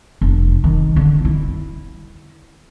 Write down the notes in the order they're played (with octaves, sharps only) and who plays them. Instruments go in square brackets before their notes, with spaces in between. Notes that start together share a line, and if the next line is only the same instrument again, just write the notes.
[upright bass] F1
D#3
D3
E4